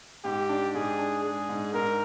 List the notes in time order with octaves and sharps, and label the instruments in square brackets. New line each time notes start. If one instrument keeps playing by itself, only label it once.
[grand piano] G#2 [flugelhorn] G4
[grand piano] D4
[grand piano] G#2 [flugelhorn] G#4
[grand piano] D4
[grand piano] G#3 [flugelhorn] G#4
[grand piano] G#2
[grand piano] G#2 [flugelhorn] A#4